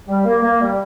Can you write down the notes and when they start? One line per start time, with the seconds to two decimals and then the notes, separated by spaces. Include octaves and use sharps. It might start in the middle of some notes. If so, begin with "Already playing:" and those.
0.08 G3
0.25 A#3
0.42 A#3
0.61 G3